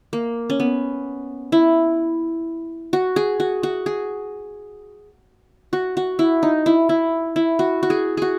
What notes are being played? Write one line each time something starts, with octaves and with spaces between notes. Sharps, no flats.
A#3
C#4
B3
E4
F#4
G#4
F#4
F#4
G#4
F#4
F#4
E4
D#4
E4
E4
E4
F#4
F#4
G#4
F#4 G#4